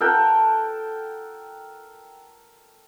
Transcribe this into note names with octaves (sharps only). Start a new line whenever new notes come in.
A4 A#4 F#5 G5